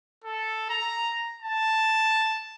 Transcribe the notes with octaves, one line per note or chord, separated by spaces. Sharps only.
A4
A#5
A5